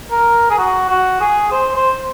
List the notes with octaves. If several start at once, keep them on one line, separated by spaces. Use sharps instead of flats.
A#4
G#4
F#4
F#4
G#4
C5
C5